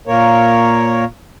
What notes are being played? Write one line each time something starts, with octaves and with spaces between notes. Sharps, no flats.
A#2 A#3 A#4 C#5